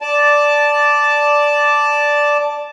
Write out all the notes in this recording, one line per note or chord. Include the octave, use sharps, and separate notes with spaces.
D5 A5